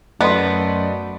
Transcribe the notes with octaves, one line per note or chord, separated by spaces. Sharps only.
F#2 A3 B3 A4 D5 D#5 C6